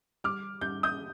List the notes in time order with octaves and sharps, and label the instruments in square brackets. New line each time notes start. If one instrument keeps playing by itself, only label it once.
[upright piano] G3 D6 F6
G3 G6
D#6 G6